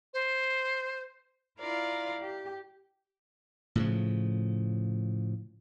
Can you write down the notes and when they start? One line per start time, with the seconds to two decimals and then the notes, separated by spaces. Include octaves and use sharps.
0.13 C5
1.59 E4 F4 A#4 D5 F5
2.21 G4
3.75 A2 C#3 F3